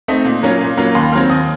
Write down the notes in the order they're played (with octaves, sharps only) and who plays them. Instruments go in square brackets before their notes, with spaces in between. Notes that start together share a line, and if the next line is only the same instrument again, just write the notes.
[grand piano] A3 C4 D#4
A#2
F#3 A#3 C#4 F4
A#2
F#3 A#3 C#4 F4
D#2 C6
D#3 F#3 C4 F6
D#2 D#6